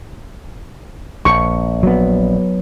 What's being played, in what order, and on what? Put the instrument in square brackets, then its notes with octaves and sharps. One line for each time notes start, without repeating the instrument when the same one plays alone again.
[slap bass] A#1 [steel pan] C#6
[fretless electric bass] F#3 B3